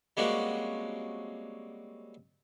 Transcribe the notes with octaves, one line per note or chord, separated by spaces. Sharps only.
G3 G#3 A#3 C4 C#4 F#4